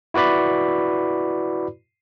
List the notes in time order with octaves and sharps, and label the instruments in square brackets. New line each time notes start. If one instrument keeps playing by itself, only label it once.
[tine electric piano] E4 F#4 B4 D5 B5